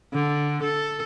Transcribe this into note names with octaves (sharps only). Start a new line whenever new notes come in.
D3
A4